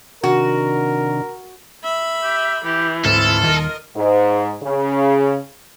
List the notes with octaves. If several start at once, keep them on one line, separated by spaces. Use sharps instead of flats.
C3 D#3 D4 F#4 A#4
E5 B5
G4
E3 G4
D2 G#2 C4 F4 A4
D#1 D#3 A#4 D#5
G#2
C#3